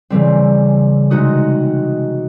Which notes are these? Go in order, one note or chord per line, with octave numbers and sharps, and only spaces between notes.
C#3 E3 G3 C4
C3 G#3 D#4 F#4 D#6